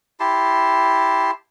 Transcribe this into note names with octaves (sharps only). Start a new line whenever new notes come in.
E4 G4 A5 C6